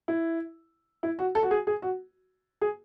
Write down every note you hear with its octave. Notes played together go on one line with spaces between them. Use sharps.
E4
E4
F#4
A4
F#4
G#4
G#4
F#4
G#4